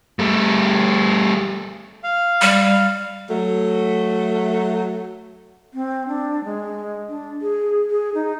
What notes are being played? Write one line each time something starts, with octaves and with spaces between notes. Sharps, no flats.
G3 A3
F5
G3
F#3 A3
C4
D4
G#3
D4
G#4
G#4
D#4